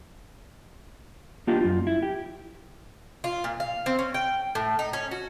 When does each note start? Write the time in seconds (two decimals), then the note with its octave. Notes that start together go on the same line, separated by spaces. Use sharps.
1.47 A#3 D4 F4 G4 D#5
1.61 F#2 F4
1.87 E4
2.03 G4
3.24 F4
3.44 A#2
3.60 F5
3.86 C4
3.99 C#4
4.14 G5
4.55 A2
4.79 D#4
4.93 C#4
5.11 F#4